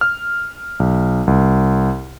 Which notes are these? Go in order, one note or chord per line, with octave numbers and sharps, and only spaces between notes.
F6
B1
C2